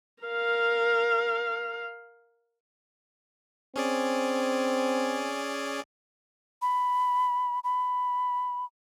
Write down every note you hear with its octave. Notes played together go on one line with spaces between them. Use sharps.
A#4 F5
C4 C#4 G#4 D5
B5
B5